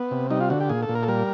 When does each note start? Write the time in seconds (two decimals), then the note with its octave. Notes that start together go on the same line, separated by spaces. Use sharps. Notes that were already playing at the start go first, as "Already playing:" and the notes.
Already playing: B3
0.11 C3
0.30 G3 D#4
0.40 F4
0.50 D3 F#4
0.60 G4
0.69 A#2 G#4
0.83 A4
0.89 A#2
0.95 A#4
1.03 A4
1.08 G3 A#4